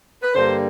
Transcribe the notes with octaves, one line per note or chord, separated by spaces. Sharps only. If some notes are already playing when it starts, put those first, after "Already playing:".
B4
G2 D3 G3 A#3 C5